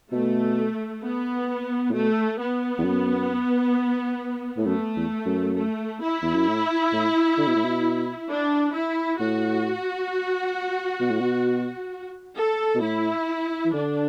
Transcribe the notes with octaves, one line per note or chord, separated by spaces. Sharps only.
B2 A3
B3
A2
B2 A3
B3
E2
F#2
A2
F#2 A3
E2
F#2
A3
E4
E2
F#2
A2
A2
D3
B2
A2
B2
D4
E4
A2 F#4
B2
A2
B2
A4
B2
A2 E4
E3
D3 D4